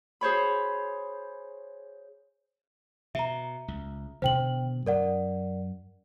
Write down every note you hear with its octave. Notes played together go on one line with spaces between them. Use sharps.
G#4 C5 C#5 B5
B2 E5 A#5
C#2
B2 D3 D#3 C5 G5 F#7
F#2 A#4 D5 F#5